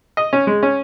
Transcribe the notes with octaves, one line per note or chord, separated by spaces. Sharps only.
D#5
C#4
G#3
C#4